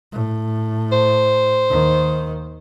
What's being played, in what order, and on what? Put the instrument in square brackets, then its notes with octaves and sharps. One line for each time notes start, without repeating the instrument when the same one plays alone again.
[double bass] A2
[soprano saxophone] C5
[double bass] D#2 D#3